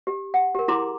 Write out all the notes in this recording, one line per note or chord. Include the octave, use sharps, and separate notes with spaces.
G4
F#5
G4 A#4
E4 G#4 A#5 C6 D6